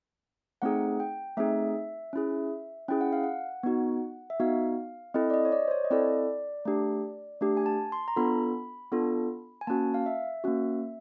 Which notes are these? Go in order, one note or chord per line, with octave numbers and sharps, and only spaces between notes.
A3 C4 D#4 G#4 F#5
G5
A3 C4 D#4 G#4 E5
C#4 E4 G#4
C#4 E4 G#4 G5
F#5
F5
F#5
B3 D#4 F#4
E5
B3 D#4 F#4 F5
C4 E4 A4 D#5
D5
D#5
C#5
D5
C5
C#5
D#5
C4 E4 A4 D5
A3 D4 G4
A3 D4 G4
G#5
A5
C6
A#5
B3 D4 F4 A4 B5
B3 D4 F4 A4
G#5
A#3 C#4 F#4 A5
F5
E5
A#3 C#4 F#4